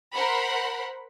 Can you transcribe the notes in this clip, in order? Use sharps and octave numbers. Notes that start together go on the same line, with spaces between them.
A#4 C5 F#5 B5